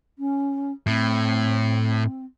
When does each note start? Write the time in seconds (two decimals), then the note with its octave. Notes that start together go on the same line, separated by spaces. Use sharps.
0.18 C#4
0.87 A2 C4